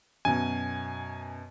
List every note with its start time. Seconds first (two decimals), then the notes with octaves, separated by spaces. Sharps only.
0.25 F#2 B2 G#5